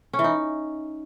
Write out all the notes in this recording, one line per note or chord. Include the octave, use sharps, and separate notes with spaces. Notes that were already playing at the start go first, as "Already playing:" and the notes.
C#4
E3
D#4